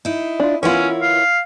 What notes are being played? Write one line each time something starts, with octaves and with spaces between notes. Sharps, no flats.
D#4 E4
D4 F4
E3 B3 C#4 E4 F4 A#4 C#5
F5